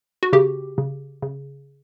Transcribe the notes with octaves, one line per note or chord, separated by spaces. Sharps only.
F#4
C#3 G4
C#3
C#3